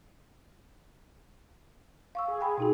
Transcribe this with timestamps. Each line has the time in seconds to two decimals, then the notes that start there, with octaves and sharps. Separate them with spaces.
2.15 F5 C#6 E6
2.28 G#4
2.41 G5 B5
2.58 B2 D#4 F#4